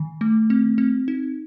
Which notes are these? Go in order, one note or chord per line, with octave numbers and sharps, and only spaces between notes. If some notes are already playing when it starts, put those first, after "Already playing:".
Already playing: D#3
A3
C4
C4
D#4